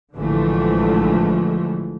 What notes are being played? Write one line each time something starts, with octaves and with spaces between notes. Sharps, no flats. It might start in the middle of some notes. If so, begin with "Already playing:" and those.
A1 D3 E3 F3 G#3 A3